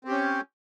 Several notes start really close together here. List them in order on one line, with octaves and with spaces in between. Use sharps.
C4 G4 C#4